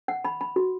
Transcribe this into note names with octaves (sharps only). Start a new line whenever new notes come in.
F#5
B5
B5
F#4